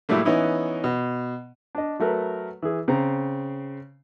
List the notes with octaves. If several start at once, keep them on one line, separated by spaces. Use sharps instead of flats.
A2 F#3 G3 A3 A#3
E3 B3 C#4 D#4 E4
B2
D4 D#5
F#3 A3 A#4 B4
E3 G#4
C#3 C4 A#5